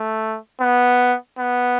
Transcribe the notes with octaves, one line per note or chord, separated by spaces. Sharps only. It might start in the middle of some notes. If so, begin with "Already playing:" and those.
Already playing: A3
B3
B3